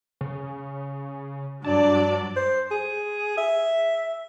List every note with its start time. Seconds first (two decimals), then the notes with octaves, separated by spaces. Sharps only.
0.21 C#3
1.64 G2 F#3 D4 D5 A5
2.36 C5
2.71 G#4
3.37 E5